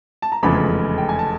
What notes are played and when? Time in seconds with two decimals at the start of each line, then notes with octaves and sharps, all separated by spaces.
0.22 A5
0.32 A#5
0.43 F1 E2 C#3 F3 G#3 B5
0.98 G5
1.09 G#5
1.19 A5